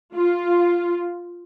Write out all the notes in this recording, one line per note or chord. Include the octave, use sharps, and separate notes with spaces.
F4